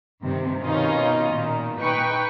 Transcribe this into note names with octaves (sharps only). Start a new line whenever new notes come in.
G2 C3 D#3
B2 D#3 C#4 D#4 F4
A#2 D#3
D#4 B4 G5 G#5 C#6